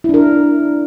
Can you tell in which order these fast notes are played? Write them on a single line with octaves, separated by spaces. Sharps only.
E4 D4 A#4